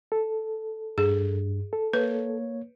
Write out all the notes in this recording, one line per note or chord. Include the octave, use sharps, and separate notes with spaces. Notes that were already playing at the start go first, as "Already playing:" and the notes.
A4
G2 G#4
A4
A#3 B4 C#5